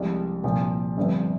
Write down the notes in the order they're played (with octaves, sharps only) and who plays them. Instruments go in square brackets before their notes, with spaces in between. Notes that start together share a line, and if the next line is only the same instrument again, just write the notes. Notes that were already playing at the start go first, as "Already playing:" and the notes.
Already playing: [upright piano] C2 C3 F3 G#3
C2 A#2 F3
G1 G2 F3 C4